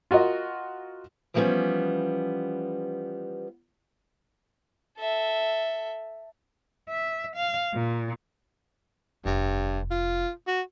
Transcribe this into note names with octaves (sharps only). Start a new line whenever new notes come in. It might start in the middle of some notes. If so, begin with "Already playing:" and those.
F4 F#4 A#4 D#5
E3 F3 G3 A#3 B3 C#4
A4 E5
E5
F5
A#2
F1 G2
F4
F#4